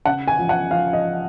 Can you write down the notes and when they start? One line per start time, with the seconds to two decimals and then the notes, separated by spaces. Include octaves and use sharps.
0.06 C#3 F#5
0.28 G#5
0.38 F3
0.49 F#5
0.71 F3 F5
0.93 D#5